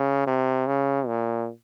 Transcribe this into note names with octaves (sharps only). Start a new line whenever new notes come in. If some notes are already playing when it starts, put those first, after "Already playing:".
Already playing: C#3
C3
C#3
A#2